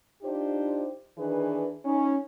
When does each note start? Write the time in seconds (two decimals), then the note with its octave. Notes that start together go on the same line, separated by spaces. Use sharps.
0.23 D4 D#4 F4 G4 C5
1.18 D#3 E3 D4 G#4 B4
1.85 C#4 D#4